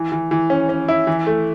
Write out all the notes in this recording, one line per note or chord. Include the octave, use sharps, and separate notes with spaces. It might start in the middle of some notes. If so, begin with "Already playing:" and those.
Already playing: E3
E3
E3
C#4
C#4
E4
E3
A3